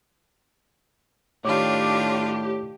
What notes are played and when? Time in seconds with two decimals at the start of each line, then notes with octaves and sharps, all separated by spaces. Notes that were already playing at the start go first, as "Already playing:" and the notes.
1.45 A2 D#3 D4 F4 G4 C#5 D6